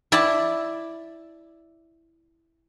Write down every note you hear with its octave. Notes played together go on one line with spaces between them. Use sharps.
E4 D5 A5